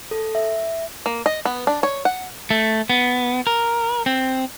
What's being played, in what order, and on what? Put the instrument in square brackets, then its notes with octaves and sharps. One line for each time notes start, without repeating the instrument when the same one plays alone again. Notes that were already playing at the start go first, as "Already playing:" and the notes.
[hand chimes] A4
E5
[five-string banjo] A#3
D#5
B3
D4
C#5
F#5
[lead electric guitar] A3
B3
A#4
C4